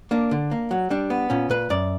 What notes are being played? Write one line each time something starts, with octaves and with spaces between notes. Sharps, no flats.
A#3 D4
D3
A#3
F#3
G3 D4
B3
A#2 C#4
A#2 B4
F#2 D5